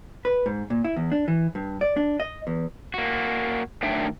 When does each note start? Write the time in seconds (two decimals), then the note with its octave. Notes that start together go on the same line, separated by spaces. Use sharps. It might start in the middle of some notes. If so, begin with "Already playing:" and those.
0.25 B4
0.46 G#2
0.70 A#2
0.84 E4
0.96 E2
1.12 D4
1.28 E3
1.55 G2
1.81 D5
1.97 D4
2.20 D#5
2.47 E2
2.94 A#3 F#4
3.83 D#3 F#3 A3 D4 E5 G5